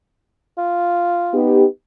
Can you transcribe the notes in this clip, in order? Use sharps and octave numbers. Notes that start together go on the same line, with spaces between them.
F4
B3 D#4 G4